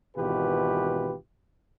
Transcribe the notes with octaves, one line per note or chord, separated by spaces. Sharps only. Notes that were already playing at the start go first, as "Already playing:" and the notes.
G#1 B2 E3 F4 G4 B4